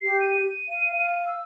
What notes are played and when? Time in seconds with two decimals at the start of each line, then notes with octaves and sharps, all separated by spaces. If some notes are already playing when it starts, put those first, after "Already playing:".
0.02 G4 C7
0.21 D#7
0.68 F5
0.95 F5
1.26 E6